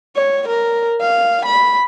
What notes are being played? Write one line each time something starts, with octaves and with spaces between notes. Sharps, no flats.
C#5
A#4
F5
B5